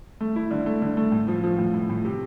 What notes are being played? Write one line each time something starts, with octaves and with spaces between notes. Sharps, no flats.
A3
E4
D3
A3
D3
A3
A2
F3
F3
A2
A2
A2
C3